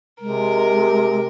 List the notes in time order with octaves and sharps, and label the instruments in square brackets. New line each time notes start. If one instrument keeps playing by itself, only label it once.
[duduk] C3 [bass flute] G#3 [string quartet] A#4